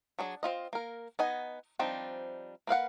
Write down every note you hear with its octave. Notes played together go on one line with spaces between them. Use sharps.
F#3 D4 G#4
C4 C#4 F4 D#5
A#3 A#4
B3 D#4 D#5 F#5 G#5
F3 G3 C4 D4 D#4
A#3 B4 F5 F#5